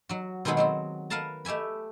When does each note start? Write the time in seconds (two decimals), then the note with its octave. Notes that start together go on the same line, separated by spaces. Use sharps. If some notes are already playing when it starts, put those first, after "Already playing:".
0.09 F#3 F#4
0.45 B2 D#3 G#3 B3 C4 G#4
0.57 F#3 C4 F#4
1.10 A#4 B4 F5 F#5 A5 A#5
1.45 A3 G4 E5 G#5 B5